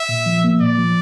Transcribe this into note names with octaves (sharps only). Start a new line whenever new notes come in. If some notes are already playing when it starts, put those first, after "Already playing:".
Already playing: E5
A#2
F3
A#3
A#2 D5
F3